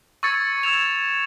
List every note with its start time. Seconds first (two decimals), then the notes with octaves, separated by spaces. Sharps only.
0.23 C#6 E6 G#6 A6 C#7
0.63 E6 G#6 E7 F7